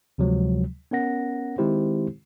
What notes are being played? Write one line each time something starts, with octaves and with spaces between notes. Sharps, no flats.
D2 C3 F3 F#3 G#3
B3 C#4 A#4 F#5 A#6
D#3 G#3 C4 E4 G4 C5